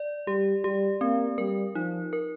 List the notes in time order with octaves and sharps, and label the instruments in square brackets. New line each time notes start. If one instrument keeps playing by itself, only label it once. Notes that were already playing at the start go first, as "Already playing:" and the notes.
Already playing: [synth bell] D5
[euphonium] G3 [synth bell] G4
[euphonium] G3 [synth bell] G4
[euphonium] A#3 [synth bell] C4
[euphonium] G3 [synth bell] A#4
[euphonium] F3 [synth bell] D#4
[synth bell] A#4